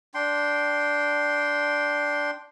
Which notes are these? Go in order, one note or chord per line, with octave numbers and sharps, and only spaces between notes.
D4 G5 C6